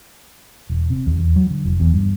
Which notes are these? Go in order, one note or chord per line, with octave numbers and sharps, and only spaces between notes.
E1
C3
D#2
E2
F#3
D3
F1
E2
G2